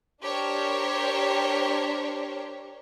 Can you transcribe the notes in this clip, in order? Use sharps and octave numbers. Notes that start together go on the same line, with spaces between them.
D4 G4 A#4 C5 C#5